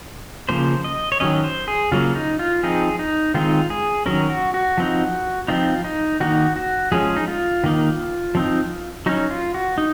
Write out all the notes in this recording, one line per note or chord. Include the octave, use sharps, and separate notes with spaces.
C#3 F3 A#3 C5
D#5
C#5
D#3 F#3 C#4 D#5
C5
G#4
C#3 F#3 A#3 F4
D#4
F4
F3 C4 D#4 G#4
D#4
D#3 G#3 C4 D#4 F4
G#4
D#3 F#3 C#4 A#4
F#4
F#4
F3 C4 D#4
F3 C4 D#4 F4
D#4
D#3 A#3 D#4 F#4
F#4
F3 G#3 C#4 G#4
D#4
F4
D#3 A#3 D#4
F3 C4 D#4
F#3 C#4 D#4
F4
F#4
D#4